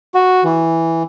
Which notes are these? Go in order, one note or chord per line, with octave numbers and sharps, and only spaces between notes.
F#4
E3